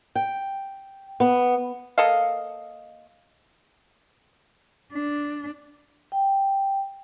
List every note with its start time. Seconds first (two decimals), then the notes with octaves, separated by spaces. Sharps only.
0.15 G5
1.20 B3
1.98 A#3 A4 D#5 F5
4.93 D4
6.12 G5